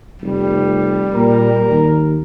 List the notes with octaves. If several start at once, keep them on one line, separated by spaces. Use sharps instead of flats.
F1 G3
A#2 A#4
D#2